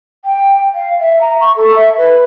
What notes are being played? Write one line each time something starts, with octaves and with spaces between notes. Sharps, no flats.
G5
F5
E5
A#5
C#6
A4
E5
B4